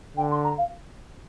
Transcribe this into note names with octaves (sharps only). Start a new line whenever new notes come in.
D3 G5
C6
A#5
F5